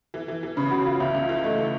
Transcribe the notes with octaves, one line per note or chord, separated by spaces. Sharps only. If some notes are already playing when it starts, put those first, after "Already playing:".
E3
E3
E3
C#3 B4 B5
C#3 F#4 F#5
E3 F4 F5
C#2 E5
E5
C#2
F4 F5
E3 E5
A3 D#5
E3